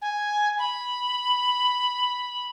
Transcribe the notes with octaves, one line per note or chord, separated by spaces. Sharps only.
G#5
B5